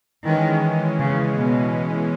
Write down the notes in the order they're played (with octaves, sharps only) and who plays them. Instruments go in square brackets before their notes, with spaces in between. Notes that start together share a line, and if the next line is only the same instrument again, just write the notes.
[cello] D#3 [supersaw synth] E3 G#3 C#4
[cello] C#3
B2